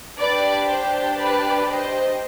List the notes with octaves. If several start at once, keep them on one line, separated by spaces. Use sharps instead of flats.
D4 G4 B4 D5
C5
B4 D5
C5 D#5